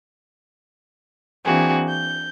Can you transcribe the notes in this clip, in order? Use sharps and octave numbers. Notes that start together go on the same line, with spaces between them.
E3 A#3 C4 D4 F#4 G#4
G6